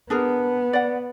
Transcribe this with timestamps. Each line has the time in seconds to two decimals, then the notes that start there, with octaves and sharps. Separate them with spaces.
0.10 B3 D4 G#4 A#4
0.73 D5 F#5